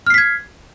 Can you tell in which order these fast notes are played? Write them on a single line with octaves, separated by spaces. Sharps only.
F6 C7 B6 G#6